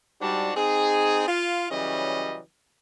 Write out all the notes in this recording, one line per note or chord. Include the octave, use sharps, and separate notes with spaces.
G#2 G3 D4 F#4 A5
C4 D#4 G#4
F4 F5
C#3 E3 F#3 G3 D#5